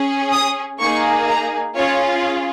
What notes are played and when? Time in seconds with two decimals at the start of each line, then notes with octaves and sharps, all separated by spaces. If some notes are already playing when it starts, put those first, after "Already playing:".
Already playing: C#4 G#4
0.32 D#6
0.80 A#3 D#4 G#4 C#6
1.28 A#5
1.76 C#4 F4 G#4 C#5